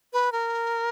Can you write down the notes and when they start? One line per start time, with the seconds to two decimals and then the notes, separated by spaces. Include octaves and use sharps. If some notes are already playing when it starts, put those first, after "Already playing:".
0.13 B4
0.32 A#4